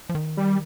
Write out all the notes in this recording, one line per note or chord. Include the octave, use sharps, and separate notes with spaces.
F3
D#3
G3